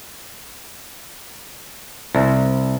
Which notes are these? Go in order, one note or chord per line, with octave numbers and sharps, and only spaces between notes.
C2